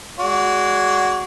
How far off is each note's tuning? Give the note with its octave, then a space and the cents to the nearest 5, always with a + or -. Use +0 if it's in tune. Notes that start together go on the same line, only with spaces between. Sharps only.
G#3 -5 F#4 +0 D5 -35